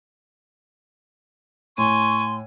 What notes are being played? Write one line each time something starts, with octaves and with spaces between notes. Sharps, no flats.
A2 G#5 C6 C#6